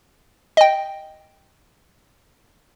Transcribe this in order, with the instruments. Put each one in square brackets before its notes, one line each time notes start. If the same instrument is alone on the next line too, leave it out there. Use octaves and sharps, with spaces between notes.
[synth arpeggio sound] D#5 G5